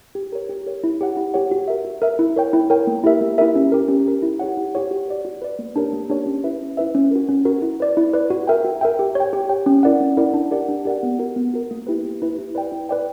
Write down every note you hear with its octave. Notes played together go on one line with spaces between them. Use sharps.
G4
A#4 C#5
G4
A#4 C#5
E4
G4 C#5 F#5
E4
G4 C#5 F#5
F#4
A#4 E5
F#4
A#4 E5
E4
A#4 C#5 G5
E4
A#4 C#5 G5
A#3
E4 G4 A#4 E5
A#3
E4 G4 A#4 E5
C#4
G4 A#4
C#4
G4 A#4
E4
G4 C#5 F#5
E4
G4 C#5 F#5
F#4
B4 D5
F#4
B4 D5
A#3
D4 G4 A#4 C#5
A#3
D4 G4 A#4 C#5
C#4
E4 B4 E5
C#4
E4 B4 E5
C#4
F#4 A#4
C#4
F#4 A#4
E4
B4 D5
E4
B4 D5
F#4
A#4 E5 G5
F#4
A#4 E5 G5
G4
C#5 G5
G4
C#5 G5
C#4
E4 A#4 D5 F#5
C#4
E4 A#4 D5 F#5
D4
G4 A#4 D5 F#5
D4
G4 A#4 D5 F#5
B3
F#4 A#4
B3
F#4 A#4
A#3
E4 G4 B4
A#3
E4 G4 B4
E4
B4 D5 G5
E4
B4 D5 G5